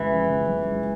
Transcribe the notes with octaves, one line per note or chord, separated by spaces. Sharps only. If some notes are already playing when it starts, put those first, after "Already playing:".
Already playing: F#2 C#3 E3 G#3
F3
C#3
F#2
G#3